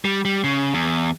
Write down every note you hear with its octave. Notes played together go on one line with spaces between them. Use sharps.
G3
G3
C#3
E2